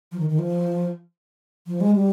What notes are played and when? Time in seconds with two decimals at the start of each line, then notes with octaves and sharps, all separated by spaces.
0.12 F3
0.19 D#3
0.30 D#3
0.39 F3
1.67 F3
1.81 G#3
1.96 G3